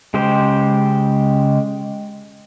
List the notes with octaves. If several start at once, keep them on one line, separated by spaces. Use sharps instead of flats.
C#3 G#3 G4 C5